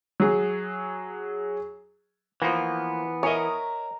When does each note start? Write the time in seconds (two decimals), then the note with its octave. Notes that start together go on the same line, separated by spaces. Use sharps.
0.20 F#3 G#4
2.42 E3 F3 A#3 B3
3.23 A#4 C#5 D#5 E5 G#5 A#5